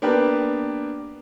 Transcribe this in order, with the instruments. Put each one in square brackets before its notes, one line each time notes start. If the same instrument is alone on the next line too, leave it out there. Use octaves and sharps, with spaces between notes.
[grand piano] A#3 B3 D4 G4 A#4 B4